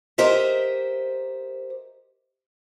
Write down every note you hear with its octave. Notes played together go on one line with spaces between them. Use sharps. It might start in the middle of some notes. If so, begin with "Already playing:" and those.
G4 A#4 C5 D#5 E5